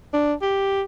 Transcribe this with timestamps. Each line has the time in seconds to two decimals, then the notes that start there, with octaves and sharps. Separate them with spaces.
0.13 D4
0.42 G4